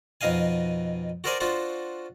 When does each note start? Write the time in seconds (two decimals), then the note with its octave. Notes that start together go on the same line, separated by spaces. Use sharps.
0.21 F2 B2 D#4 D#5 F5 G#5
1.24 F#4 A4 A#4 C5 D5 G#5
1.40 D4 F4 F#4 A4 C5